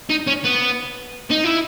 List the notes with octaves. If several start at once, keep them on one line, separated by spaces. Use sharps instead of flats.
D#4
C#4
B3
D#4
E4